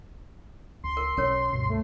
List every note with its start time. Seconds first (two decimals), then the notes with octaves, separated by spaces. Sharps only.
0.84 C#2 C6
0.97 A#4
1.17 B1 C#4 A#4 C#5
1.53 C#2 G2 B2
1.70 A3